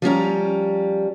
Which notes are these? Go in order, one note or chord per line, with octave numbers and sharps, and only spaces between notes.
F3 G3 C#4 A#5